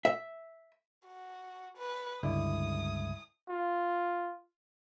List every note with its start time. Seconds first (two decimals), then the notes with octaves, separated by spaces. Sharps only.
0.05 E5
1.07 F#4
1.77 B4
2.23 C#2 G2 D3 E4 D#6
3.49 F4